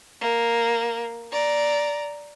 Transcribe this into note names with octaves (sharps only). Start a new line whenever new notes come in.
A#3
D5 A#5